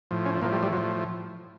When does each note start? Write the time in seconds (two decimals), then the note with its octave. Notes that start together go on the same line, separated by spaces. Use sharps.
0.11 A2 F3
0.26 C#4
0.41 A2 F3 A#3
0.52 G3
0.63 G3
0.73 A2 F3 F#3